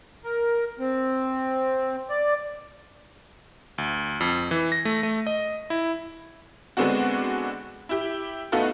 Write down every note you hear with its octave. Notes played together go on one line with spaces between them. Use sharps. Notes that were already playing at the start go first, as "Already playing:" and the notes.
A#4
C4
D5
D2
F2
E3
A#6
A3
A3
D#5
E4
D3 G#3 B3 C4 D4 F#4
E4 G4
A3 B3 D#4 F4 F#4 A4